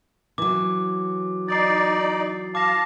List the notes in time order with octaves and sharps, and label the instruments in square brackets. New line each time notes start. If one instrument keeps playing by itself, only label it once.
[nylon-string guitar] E3 F#3 [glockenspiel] D6
[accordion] D#4 D5 [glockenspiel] A6 C7
[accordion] F5 A5 [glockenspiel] D6 A#6